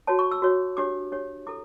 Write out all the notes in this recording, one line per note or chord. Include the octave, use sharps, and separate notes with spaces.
F#4 C#5 A5
C#6
E6
F#4 C#5
D4 G4 C#5 D6
D4 G4 C#5
E4 A4 D6